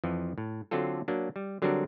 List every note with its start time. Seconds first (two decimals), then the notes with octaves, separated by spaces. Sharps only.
0.04 F2 E3 F3
0.38 A2
0.71 D3 F#3 C4 D4 F4 A4
1.08 F#3 A#3 D4
1.36 G3
1.62 D3 F#3 G3 C4 D4 A#4